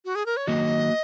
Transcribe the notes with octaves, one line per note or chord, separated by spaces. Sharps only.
F#4
G#4
A#4
C#5
D#3 F#3 A#3 F#4 D#5